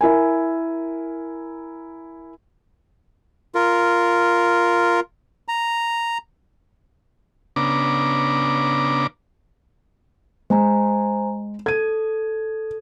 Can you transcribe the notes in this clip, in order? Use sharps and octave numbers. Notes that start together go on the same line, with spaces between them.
E4 A#4 G#5
F4 A#4
A#5
C#3 B3 D4 A#5 D6
G#3 C5 G#5 A#5
A4 G#6 D#7